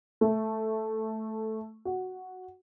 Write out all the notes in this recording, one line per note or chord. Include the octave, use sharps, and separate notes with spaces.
A3
F#4